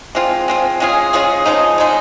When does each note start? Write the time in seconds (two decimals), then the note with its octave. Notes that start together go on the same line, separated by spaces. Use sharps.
0.15 G#3 C4 F4
0.48 G#3 C4 F4
0.80 G#3 C#4 F4 G#4
1.13 G#3 C#4 F4 G#4
1.46 C#3 F3 G#3 D#4
1.78 C#3 F3 G#3 D#4